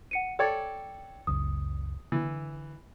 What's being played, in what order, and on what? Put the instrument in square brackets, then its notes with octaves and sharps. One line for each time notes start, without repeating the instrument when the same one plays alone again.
[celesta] F#5 C#7 D#7
[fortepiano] A4 C#5 D5 [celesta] G5 G#6
[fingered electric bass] F#1 C#2 [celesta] D#6
[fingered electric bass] D3 [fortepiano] E3